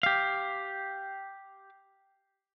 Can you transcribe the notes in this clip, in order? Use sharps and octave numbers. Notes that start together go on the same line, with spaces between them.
G4 F5